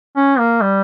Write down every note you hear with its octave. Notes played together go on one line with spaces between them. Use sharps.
C#4
A#3
G3